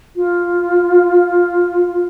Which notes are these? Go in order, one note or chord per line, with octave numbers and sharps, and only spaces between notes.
F4